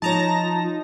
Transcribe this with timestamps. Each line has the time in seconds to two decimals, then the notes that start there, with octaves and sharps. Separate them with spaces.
0.02 F3 D#4 F4 C#5 A5 A#5 A#6